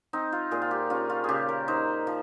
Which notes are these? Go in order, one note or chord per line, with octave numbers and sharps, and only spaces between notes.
C4 D#4
F4
A#2 G#4
F4
G4
C#4 F4
F4
C#3 G4 G#4
A#4
D#4 C5
F3